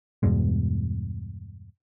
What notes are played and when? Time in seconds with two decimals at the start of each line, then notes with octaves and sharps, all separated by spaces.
0.23 E2 G2 B2 G#3